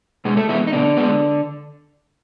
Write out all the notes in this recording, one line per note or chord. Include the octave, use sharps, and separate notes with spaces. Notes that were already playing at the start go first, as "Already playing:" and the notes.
B2 G#3 G#4
A3 A4
E3 G#3 B3 E4
D#4
B2 D3 D4
G#3 B3